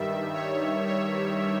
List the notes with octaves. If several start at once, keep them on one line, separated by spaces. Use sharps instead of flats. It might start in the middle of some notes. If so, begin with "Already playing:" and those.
Already playing: G2 D#3 G3 E5
C#5
C#5